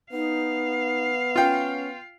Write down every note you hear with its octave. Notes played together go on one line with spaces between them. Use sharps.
B3 D#4 F5
C#4 F4 G5